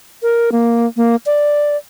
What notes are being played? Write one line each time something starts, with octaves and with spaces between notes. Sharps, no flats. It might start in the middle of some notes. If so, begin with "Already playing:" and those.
A#4
A#3
A#3
D5